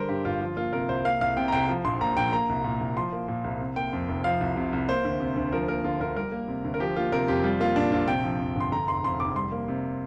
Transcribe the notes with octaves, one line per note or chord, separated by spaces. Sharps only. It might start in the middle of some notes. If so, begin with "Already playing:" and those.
Already playing: D3 G3 A#4 C5
G2 G4
G1 F4
F3 F4
A#3 F4
C3 A#4
C2 C5
A#3 F5
C2 F5
C3 G5
A#5
C2 G5
F3
A#1 C6
A#2 A#5
A#1 G5
A#3 A#5
C2
A#2
C2
F3 C6
A#3
A#2
C2
C3
A#3 G5
F2
F1
F3 F5
C2
C3
C2
A#3 C5
D2
C3
D2
F3 A#4
A#3 A#4
D3 F4
D2 A#4
G3 A#4
A#3
C3
D2
A#4
F3 G4
A#3 F4
C3 A#4
F2 G4
G3 F4
A#3 F4
A#2 D4
A#1 F4
C3 G5
F3
F2
G1 C6
D3 A#5
F1 C6
F2 C6
F1 D6
G3 C6
A#3
C3